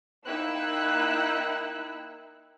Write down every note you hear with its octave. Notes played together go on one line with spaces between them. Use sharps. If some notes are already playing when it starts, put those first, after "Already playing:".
A#3 D#4 E4 G5 E6 F#6